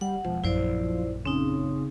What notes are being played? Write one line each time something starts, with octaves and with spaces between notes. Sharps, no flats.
G3 F#5
E1 F3
A#1 F#2 E4 C5 D5
C#3 C4 D#4